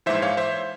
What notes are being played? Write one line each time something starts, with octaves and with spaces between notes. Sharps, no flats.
A#1 G#2 E3 C5 E5
C#5 F5
C5 E5